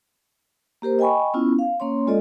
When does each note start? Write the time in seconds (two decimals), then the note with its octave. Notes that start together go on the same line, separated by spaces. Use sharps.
0.82 A#3 G4 A#4 C5
0.99 D#5 G5 G#5 B5 C#6
1.34 B3 C#4 E4 F4
1.59 F5
1.80 A#3 C#4 C#5 C6
2.07 G#3 F4 A4 D5 D#5